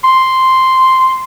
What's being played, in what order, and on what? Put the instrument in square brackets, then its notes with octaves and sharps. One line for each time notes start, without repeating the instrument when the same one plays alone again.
[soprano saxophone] C6